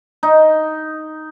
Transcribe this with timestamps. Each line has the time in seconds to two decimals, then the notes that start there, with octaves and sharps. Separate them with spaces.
0.23 D#4